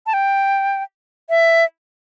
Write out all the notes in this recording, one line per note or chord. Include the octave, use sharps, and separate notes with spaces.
A5
G5
E5